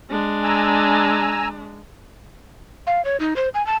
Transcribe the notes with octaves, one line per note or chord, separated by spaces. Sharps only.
G#3 D4
G#5 A#5 E6
F5
C#5
D#4
C5
G#5
A5